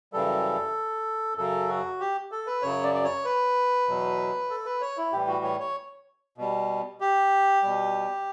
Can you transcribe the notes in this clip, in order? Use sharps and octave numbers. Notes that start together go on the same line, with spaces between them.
F#2 C#3 E3 G3 A4
F#2 C#3 F#3 A4
F#4
G4
A4
B4
F#2 C#3 F#3 C#5
D5
D5
C#5
B4
E2 B2 F#3
A4
B4
C#5
E4
A2 E3 G3 G4
F#4
C#5
C#5
B2 G3
G4
B2 G3